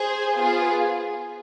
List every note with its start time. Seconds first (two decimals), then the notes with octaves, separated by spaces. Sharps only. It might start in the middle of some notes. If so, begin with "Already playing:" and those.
Already playing: G#4 C5
0.34 B3 F4 G#4